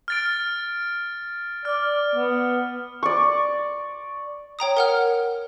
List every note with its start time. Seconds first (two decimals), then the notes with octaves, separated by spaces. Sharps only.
0.08 F6 A6 D7
1.65 D5 F6
2.15 B3
3.03 D5 C#6
4.59 C#5 G5 A#5 D#6
4.77 A#4 F#5 F6